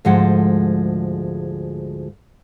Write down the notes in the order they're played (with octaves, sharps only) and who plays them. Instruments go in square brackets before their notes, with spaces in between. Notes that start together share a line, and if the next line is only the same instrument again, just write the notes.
[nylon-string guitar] D2 G#2 F3 G#3 F#5